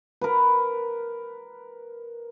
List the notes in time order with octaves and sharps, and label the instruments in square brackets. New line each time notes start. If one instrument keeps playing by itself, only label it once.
[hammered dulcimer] A#4 B4